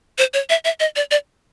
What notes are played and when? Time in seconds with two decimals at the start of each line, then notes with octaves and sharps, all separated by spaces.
0.18 C5
0.34 C#5
0.50 E5
0.65 E5
0.80 D#5
0.96 D5
1.11 D5